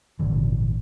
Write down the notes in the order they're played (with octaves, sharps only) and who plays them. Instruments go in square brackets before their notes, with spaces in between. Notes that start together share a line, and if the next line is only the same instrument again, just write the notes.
[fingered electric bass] G#1 A#2 D3 E3